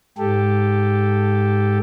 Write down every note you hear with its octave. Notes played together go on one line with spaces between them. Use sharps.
G#2 G4 A4